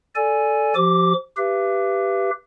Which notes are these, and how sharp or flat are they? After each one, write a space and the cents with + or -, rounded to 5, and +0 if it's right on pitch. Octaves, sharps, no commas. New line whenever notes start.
A4 +0 D5 -10 G#5 +5
F3 +5 G4 -40 D6 +0
G4 +0 B4 +0 E5 +45